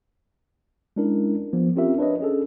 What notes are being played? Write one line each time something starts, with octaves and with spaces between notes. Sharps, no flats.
G#3 C#4 D4 E4 A#4
F3 B3
C4 C#4 F4 G4 A#4 E5
D4 B4 C#5 D#5
C#4 G#4 A4